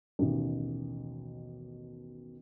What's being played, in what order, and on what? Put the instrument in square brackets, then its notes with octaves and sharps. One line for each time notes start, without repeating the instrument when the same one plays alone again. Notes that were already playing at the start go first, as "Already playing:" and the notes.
[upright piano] A1 D#2 B2